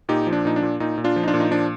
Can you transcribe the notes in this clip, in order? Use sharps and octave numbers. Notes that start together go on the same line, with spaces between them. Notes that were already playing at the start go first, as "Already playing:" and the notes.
A#2 D#4 G4
F3
D4
A#2 D#4
D4
A#2
A#2 D#4
A#2
D4 F4
F3
D#4
D4 F4
A#2
D#4
F3 D4